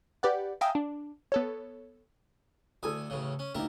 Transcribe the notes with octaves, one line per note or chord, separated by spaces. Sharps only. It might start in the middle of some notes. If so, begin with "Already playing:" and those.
G4 B4 D5 F#5
E5 F5 G5 G#5 A#5 D#6
D4
B3 A4 C#5
D2 A4 G#5 D#6
A1 A2 C#3
C#4
D2 A#3 D#4 G4 E5